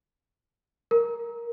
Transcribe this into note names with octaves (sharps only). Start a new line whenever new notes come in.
A#4